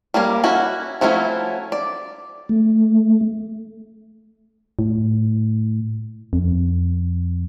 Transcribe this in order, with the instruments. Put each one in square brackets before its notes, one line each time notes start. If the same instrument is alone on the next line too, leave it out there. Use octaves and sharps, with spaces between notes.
[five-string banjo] G3 A#3 C#4 A#4
C#4 E4 F#4
F3 F#3 A3 C#4 E4
D5
[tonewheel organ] A3
[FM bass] A2
F2